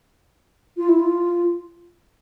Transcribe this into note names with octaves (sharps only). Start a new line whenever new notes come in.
F4
E4
F4